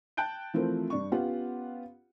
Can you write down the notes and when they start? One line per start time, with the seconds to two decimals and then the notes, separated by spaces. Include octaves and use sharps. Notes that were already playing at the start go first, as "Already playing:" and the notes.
0.17 G5 A5 F#6 G6 D7
0.54 E3 F3 A3 C4 A#4
0.90 G2 D4 C#6
1.12 B3 C#4 F4 G4 F#5